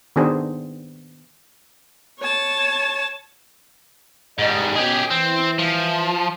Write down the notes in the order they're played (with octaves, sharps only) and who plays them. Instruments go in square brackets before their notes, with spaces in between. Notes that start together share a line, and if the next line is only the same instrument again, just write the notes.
[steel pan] D#3 B3 D4 G#4 C5
[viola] C#5 A5
[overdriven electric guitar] G#2 G3 [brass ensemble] D#5
[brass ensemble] B2 C#4 D#5 [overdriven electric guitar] G4 G#4
[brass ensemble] E3 [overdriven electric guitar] C4
[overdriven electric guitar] F3